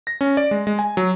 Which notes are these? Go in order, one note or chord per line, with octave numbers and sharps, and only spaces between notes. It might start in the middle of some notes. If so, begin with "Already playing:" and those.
A#6
C#4
D5
G#3
G#3
G#5
F#3